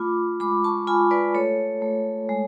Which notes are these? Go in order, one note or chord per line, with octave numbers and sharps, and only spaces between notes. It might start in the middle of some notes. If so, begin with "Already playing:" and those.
Already playing: A3 F4 B5 D6
G#3 B5 D6
A5 C#6
F4 G#5 B5
B4 D5
A3 A4 C#5
A3
G#3